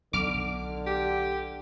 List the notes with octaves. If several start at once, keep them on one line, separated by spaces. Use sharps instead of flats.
B1 D3 D6 F6
G4